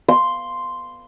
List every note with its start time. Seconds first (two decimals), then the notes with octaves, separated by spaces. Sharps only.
0.08 C6